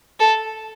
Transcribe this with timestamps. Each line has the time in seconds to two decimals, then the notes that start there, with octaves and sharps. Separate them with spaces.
0.20 A4